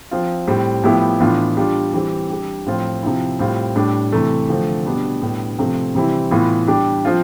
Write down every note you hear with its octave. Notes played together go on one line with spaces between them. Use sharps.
F3 C4 F4
A2 G3 C4
A2 F3 B3 E4 G4
A2 E3 B3 D4 F4
G3 D4 F4
E3 G3 C4 G4
G3 D4 G4
A2 F3 C4 F4
C3 F3 C4 E4
A2 G3 C4 F4
A2 G3 D4
C3 E3 A3
D3 F3 A3 C4
B2 G3 B3 D4
A2 G3 B3 D4
C3 F3 A3 C4
C3 E3 G3 C4 E4
A2 E3 B3 F4
G3 D4 G4
F3 C4 F4